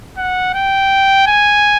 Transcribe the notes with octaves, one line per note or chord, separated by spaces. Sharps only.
F#5
G5
G#5